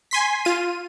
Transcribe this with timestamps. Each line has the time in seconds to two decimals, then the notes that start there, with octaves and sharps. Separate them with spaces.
0.11 G#5 C6 B6
0.45 F4 D#7